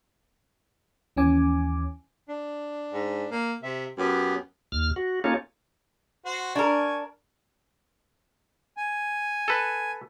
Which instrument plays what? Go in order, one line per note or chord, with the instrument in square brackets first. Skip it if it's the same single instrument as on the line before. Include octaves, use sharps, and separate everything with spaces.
[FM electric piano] D#2 E3 C#4 G#5 D6
[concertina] D4
[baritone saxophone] G#2
A#3
[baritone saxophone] C3 [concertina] E5
[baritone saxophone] F#2 [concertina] B3 C#4 G4
[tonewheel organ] D#2 F6
F#4
A#3 C#4 D#4 F4 A4 C#5
[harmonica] F#4 C5
[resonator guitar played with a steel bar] D4 A#4 [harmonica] G#5 C#6
[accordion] G#5
[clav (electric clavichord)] A4 B4